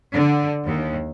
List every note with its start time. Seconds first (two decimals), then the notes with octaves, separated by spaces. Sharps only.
0.14 D3
0.65 D#2